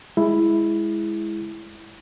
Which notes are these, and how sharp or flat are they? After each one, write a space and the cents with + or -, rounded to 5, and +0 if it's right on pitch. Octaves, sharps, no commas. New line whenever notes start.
G#3 +0 E4 +0